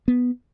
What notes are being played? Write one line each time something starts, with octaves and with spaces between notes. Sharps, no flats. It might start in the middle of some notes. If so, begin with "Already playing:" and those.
B3